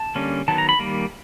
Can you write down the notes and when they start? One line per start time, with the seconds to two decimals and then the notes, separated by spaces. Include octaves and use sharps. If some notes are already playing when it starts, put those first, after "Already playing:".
Already playing: A5
0.15 D3 G3 A#3 C#4
0.48 D#3 F#3 B3 A5
0.58 A#5
0.69 B5
0.79 D#3 G3 A#3